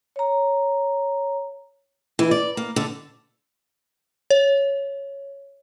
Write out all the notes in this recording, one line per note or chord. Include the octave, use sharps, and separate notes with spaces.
C#5 A#5
E3
D5
A#3
D3
C#5